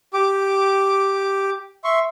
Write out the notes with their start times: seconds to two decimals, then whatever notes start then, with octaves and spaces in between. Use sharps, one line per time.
0.14 G4 D6
1.84 E5 C6 C#6